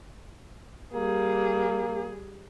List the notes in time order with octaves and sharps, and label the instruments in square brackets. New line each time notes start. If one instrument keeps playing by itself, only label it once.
[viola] G3 G#4 [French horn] A#3